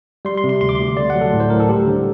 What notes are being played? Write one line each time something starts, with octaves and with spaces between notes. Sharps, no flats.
G3 C6
C6
C3
C6
D2 C6
D6
D2 C6
A3 D5
F#3 F#5
A4
A2
C5
A2 A#4
A4
G3 G4
D3